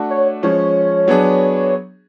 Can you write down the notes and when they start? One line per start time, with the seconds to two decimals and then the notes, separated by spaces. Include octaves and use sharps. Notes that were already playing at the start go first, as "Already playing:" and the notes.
Already playing: A3 D4 F#4
0.10 C#5
0.43 F3 G#3 C#4 C#5
1.08 F#3 B3 D4 G#4